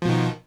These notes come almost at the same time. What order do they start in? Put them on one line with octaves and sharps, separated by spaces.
F3 B2 D#3